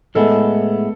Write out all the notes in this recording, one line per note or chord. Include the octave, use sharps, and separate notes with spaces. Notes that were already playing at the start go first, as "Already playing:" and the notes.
A2 G#3 B3 E4 A4